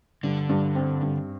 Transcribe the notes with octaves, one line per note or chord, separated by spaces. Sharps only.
G2 D3
G2
C4
G2